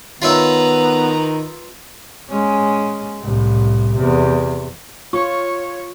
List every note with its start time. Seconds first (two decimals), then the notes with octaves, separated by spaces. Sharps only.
0.22 D#3 B3 F4 B4 C#5 E5 A#5
2.30 G#3 C#4
3.20 C2 A2
3.96 E2 C3
5.13 F4 C#5 C#6